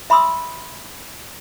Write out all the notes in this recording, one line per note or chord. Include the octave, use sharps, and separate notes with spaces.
E5 B5 C6 D#6 E6